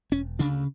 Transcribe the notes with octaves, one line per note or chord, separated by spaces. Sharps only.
E1 C#4
D2 C#3 D4